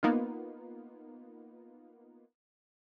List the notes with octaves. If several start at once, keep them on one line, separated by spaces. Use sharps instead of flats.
A#3 B3 D#4 F4